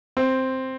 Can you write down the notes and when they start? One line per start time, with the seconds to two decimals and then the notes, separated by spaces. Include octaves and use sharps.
0.17 C4